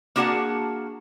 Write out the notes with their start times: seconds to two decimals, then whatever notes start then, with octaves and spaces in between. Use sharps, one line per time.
0.16 A#3 D4 F#4 G#4 F#5 A5